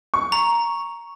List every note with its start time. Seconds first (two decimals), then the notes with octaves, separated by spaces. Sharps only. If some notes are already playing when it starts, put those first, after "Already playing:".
0.14 C#6
0.32 A#5